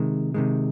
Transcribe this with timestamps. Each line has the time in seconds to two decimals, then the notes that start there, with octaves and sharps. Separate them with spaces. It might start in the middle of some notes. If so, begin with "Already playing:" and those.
Already playing: C3 D#3 G#3
0.34 C3 D#3 G#3